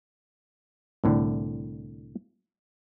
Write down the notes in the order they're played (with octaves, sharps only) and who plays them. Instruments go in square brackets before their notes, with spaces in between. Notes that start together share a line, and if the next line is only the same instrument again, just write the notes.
[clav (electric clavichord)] C2 A2 D3